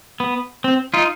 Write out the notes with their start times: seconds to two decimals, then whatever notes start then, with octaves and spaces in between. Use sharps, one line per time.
0.20 B3
0.64 C4
0.94 D#4 F4